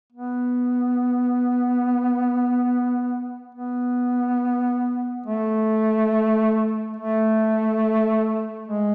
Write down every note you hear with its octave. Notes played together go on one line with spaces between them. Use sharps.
B3
B3
A3
A3
G#3